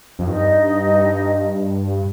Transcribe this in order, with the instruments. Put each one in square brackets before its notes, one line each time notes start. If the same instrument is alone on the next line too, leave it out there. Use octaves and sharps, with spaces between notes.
[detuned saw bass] F2
[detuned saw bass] G2 [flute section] D#4 D#5